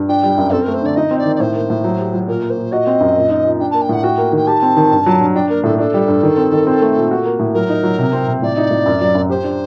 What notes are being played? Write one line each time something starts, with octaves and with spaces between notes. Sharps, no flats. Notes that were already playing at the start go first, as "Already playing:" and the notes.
Already playing: G2
D4 G5
G3
F#2
C4 A4
A#4
A3
C5
D3 D5
D#4 D#5
C4
D5
D#3
D5
A2 C5
A#3
A2
F#3
G4
F#3
A#2 A#4
A#3
C5
A#2
F#4 D#5
C4
F#2
A#2
D#4
A#2
D4 G5
A#3 A5
G5
A2 F#5
F#4 G5
A#3
D#3 G5
G4 A5
C4
D#3
G2
F#3
G2
D4 G5
A#3 A#4
A2 A4
D4 A4
G3
G2
D#3
C4
D#3
C4
A3
A#2
F#4
A#3
A2
F#3 A#4
D#4
F#3
C3
C4
C3
A2 D5
D#4
A2
F#2
F#3
F#2
G4 C5
D4